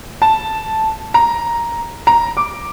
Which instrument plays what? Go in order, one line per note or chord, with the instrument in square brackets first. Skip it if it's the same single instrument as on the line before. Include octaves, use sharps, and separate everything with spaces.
[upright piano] A5
A#5
A#5
D6